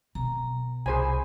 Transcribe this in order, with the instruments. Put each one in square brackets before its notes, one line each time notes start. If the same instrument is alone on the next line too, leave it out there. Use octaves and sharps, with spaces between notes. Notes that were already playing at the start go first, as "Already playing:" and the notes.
[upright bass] B2 [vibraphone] A#5
[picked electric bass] C2 [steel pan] G#4 C5 G#5 [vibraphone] B5